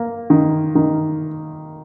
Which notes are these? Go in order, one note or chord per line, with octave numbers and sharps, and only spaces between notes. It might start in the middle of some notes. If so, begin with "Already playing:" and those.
Already playing: A#3
D#3
D#3